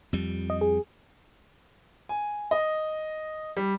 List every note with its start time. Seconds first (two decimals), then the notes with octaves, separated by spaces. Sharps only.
0.13 F2 G3
0.50 D#5
0.61 G#4
2.09 G#5
2.51 D#5
3.57 G3